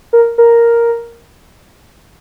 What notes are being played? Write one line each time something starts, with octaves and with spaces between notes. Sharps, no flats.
A#4
A#4